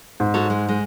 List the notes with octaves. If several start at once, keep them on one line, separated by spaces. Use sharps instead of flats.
G#2
F#4 A4 C#5
G#3
G#3